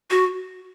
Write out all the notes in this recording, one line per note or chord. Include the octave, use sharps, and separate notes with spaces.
F#4